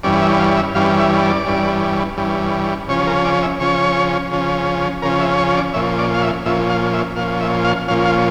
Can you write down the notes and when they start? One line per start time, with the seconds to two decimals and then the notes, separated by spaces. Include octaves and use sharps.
0.03 G2 E3 G3 C#4 D5
0.22 E5
0.39 F5
0.57 E5
0.75 G2 E3 G3 C#4 F5
0.99 E5
1.22 D5
1.45 G2 E3 G3 C#4
2.17 G2 E3 G3 C#4
2.88 C#3 F3 C#4 C#5
3.07 A#4
3.25 D5
3.43 E5
3.60 C#3 F3 C#4 C#5
4.31 C#3 F3 C#4
5.02 C#3 F3 C#4 A#4
5.20 E5
5.38 C#5
5.57 D5
5.73 A#2 F3 C#4 E5
5.98 D5
6.14 F5
6.22 E5
6.45 A#2 F3 C#4 E5
6.70 F5
6.93 E5
7.16 A#2 F3 C#4 F5
7.41 E5
7.65 F5
7.88 A#2 F3 C#4 F5
8.05 F5